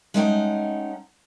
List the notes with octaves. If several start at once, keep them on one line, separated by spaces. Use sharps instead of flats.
G#3 A3 C#4 D#4 F#5 G5